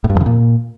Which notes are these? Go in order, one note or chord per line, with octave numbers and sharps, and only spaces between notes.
A2
G2
F2
C#3
A#2